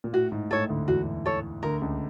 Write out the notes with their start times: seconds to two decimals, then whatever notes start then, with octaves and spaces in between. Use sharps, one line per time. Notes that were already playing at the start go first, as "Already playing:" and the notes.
0.04 A#2
0.13 A2 F#4
0.32 G#2
0.51 A2 A4 C#5
0.69 D2 D3
0.88 E2 E3 F#4
1.26 A4 C#5
1.63 D2 D3 A#4
1.81 C#2 C#3